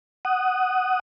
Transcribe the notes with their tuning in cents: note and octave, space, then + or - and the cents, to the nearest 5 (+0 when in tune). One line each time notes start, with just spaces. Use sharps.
F#5 +10 D#6 +0